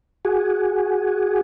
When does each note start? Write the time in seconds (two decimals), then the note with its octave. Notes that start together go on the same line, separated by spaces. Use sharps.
0.25 F#4 G#4